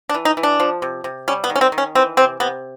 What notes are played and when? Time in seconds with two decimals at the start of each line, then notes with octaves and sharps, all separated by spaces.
0.09 D4
0.14 E3
0.25 D#4
0.37 E3
0.43 D4
0.60 F3
0.82 C3
1.04 C3
1.28 G3 C#4
1.44 B3
1.50 D#3
1.56 C#4
1.61 C4
1.72 D#3
1.78 C#4
1.95 E3 C4
2.17 C3 C4
2.40 C3 B3